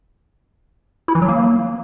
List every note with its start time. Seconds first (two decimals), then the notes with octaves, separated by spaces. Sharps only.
1.08 E4
1.15 E3
1.22 F#3
1.29 A#3